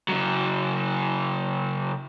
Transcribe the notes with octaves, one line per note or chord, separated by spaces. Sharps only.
C#3 F#3